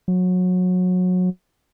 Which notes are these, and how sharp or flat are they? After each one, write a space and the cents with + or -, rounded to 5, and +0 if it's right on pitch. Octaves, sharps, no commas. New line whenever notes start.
F#3 -25